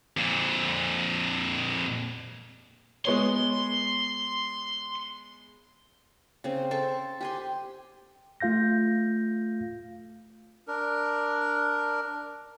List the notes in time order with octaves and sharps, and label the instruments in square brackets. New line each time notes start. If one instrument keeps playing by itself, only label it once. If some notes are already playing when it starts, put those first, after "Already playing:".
[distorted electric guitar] F2 A#2
[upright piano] G#3 B3 C#5 [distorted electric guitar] C6
[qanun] C#3 C4
A4 C5 C#6
G4 G#5 C6
[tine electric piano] A3 F4 F5 G6 A#6
[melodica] D4 A#4